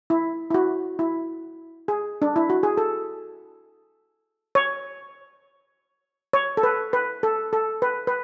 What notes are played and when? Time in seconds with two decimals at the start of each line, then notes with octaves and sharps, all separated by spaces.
0.10 E4
0.51 E4
0.54 F#4
0.99 E4
1.88 G#4
2.22 D4
2.36 E4
2.50 F#4
2.63 G#4
2.77 A4
4.55 C#5
6.33 C#5
6.57 A4
6.63 B4
6.93 B4
7.23 A4
7.53 A4
7.82 B4
8.07 B4